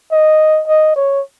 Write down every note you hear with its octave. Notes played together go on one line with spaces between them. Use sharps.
D#5
D#5
C#5